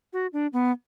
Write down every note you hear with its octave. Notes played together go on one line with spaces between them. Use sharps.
F#4
D4
B3